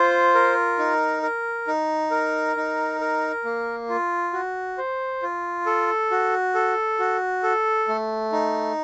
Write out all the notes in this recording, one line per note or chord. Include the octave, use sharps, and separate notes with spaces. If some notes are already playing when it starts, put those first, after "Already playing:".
Already playing: F4 C5
A#4
D#4
A#4
D#4
A#4
D#4
A#4
A#3
F4
F#4
C5
F4
A4
F#4
A4
F#4
A4
A3
D#4